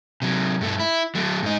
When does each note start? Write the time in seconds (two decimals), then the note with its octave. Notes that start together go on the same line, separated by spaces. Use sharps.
0.22 C3 F#3
0.61 G2 A3
0.79 E4
1.15 F#3 A3
1.43 G#2 D#4